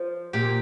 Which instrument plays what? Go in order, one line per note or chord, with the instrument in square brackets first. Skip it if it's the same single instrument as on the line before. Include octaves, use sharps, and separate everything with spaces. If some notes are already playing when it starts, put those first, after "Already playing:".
Already playing: [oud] F3
[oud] A#2 [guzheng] G4